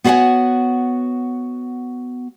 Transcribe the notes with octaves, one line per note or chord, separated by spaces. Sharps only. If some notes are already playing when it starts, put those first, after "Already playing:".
B3 F#4 C#5 F5 F#5 G#5